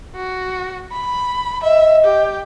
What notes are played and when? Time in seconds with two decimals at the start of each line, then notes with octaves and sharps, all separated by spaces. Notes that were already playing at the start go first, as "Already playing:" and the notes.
0.15 F#4
0.92 B5
1.63 D#5 E5
2.04 G4